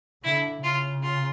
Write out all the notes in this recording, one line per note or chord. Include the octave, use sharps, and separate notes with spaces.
D3 E4
C#3 F4
F4